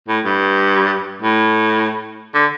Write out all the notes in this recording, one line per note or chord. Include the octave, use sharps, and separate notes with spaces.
A2
G2
A2
D3